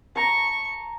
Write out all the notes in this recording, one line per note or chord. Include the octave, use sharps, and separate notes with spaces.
A5 A#5 C#6